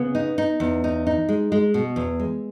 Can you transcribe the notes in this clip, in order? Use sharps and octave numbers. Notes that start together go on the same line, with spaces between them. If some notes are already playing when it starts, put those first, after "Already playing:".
Already playing: C#3 B3
D#4
D#4
E2
D#4
D#4
G#3
G#3
B2
E2
G#3